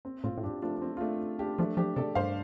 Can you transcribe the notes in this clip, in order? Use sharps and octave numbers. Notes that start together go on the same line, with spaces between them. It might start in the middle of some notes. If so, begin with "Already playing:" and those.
C4
A2 C4 F4
A2
G2 D4 G4
F3 A3 D4
D4
C4
F4
A3 D4
D4 G4
F3 A3 D4
F3 D4 G4
C3 A4 D5
G2 C5 F5